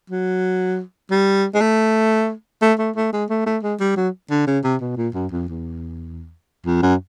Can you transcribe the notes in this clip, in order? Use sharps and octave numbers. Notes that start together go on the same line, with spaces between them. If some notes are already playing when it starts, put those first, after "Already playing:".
F#3
G3
G#3
A3
A3
A3
A3
G#3
A3
A3
G#3
G3
F#3
D3
C#3
C3
B2
A#2
F#2
F2
E2
F2
F#2